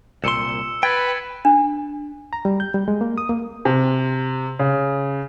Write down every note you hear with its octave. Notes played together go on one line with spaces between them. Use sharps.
C2 A#2 C6 E6 C#7 E7
B4 G5 G#6 A6 B6
D4
A#5
G3
G6
G3
G#3
A#3
D#6
A#3
C3
C#3